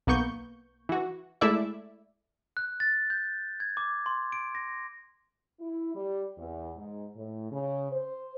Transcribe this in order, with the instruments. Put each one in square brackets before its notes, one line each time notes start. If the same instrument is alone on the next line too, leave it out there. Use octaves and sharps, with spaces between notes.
[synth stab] B1 A#3 B3 C#6 G6
E3 F#4
G#3 A3 E4 D5 E5
[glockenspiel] F#6
A6
G6
G#6
D6
C6
D7
A#6
[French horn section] E4
G3
E2
G#2
A2
C#3
C5